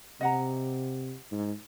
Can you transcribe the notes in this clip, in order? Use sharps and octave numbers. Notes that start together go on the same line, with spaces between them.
C3 D#5 F#5 A#5
G#2